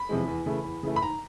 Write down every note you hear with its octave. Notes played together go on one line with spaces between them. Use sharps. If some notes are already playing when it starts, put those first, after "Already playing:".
Already playing: B5
E2 C3 F3 G#3
E2
C#3 E3 A3
E2
C#3 E3 A3
B5
G#2 A#5